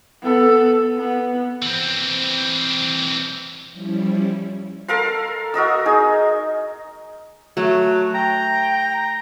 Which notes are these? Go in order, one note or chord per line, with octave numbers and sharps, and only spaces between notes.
B3 A4
B3
E3 C4
F3 G3 C#4 E4
A4 A#4 F5 C6
F#4 A#4 D#5 E6
D#4 G#4
F#3 A3
G5 A#5